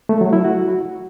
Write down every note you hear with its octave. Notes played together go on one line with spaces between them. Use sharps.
A3
F#3
E4
F#4